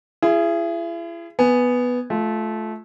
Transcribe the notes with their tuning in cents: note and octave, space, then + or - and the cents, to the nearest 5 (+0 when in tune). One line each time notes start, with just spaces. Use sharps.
E4 +40 G#4 -5
B3 +0 G#5 +0
A3 -20 F4 +0